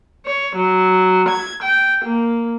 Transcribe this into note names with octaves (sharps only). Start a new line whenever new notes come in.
C#5
F#3
G#6
G5
A#3